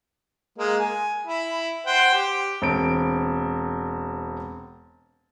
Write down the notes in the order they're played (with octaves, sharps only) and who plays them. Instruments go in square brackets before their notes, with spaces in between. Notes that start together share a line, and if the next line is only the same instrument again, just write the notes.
[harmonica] G#3 A#3
G#5
E4 B5
C5 F#5 G5
G4
[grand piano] E1 C4 D7